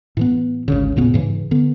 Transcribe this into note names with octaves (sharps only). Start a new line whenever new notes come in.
A2 E3 B3
G#1 D2 C#3
E1 A#2 C#3 B3
G#2 C#3 E3
D3 B3